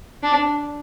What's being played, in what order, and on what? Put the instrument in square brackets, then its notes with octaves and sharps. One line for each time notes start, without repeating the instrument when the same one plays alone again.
[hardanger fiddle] D4